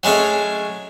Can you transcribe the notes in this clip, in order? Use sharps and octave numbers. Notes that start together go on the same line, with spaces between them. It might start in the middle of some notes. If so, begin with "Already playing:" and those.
F#3 G#3 A3 C#4